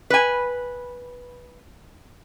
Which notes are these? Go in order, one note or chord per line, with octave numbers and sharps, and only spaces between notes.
B4 G#5